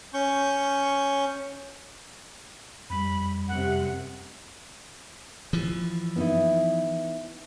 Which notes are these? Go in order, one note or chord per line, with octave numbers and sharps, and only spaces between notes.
C#4 C#6 G6
F2 G3 B5
F#2 C3 F#5
E3 F3
B3 D#4 E4